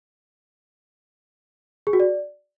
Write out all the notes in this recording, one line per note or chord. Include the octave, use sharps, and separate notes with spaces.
G#4
F#4
D5